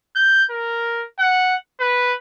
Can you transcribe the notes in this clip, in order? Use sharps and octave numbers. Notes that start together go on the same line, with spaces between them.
G6
A#4
F#5
B4